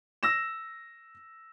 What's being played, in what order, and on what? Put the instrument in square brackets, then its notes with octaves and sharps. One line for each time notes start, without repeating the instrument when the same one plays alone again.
[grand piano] E6 A#6 E7